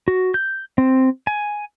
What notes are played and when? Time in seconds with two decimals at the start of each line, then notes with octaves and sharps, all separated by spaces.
0.08 F#4
0.34 G6
0.78 C4
1.27 G#5